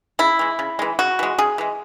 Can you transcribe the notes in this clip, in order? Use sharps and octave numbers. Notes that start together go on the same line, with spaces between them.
C#3 E4
E3 G#3
C#3
E3 G#3
C#3 F#4
E3 G#3
C#3 G#4
E3 G#3